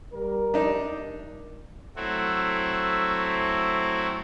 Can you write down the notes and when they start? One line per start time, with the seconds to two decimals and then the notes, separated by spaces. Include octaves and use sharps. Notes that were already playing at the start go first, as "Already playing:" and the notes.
0.13 G3 A#4
0.54 D4 D#4
1.96 F#3 A3 C4 E4 F#4